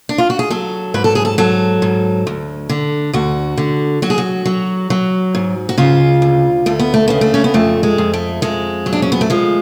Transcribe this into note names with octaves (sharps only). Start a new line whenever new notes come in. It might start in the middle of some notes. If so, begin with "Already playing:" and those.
D4
F4
F#4
G#4
F#3 A4
G#2 B4
A4
G#4
A4
F#3 A4
G#2
D2
D3
D2 F#4
D3
F#3 F#4
G#4
F#4
F#3
F#3
G#2
F#4
C#3 F4
D2
D2 A3
B3
A3
C#3 B3
A3
C#4
B3
F2 A3
G#3
F2
A3
F2 G#3
F#3
D4
C#4
B3
A3
F3 G#3